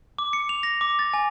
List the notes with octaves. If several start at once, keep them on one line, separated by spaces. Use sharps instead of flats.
D6
C#7
F7
A#6
D6
A6
G#5